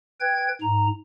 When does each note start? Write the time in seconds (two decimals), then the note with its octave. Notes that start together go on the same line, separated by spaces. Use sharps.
0.20 B4 G5 G#6
0.61 G#2 A#5